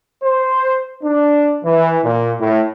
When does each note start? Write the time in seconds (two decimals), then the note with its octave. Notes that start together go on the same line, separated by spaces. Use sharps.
0.23 C5
1.04 D4
1.64 E3
2.04 A#2
2.40 A2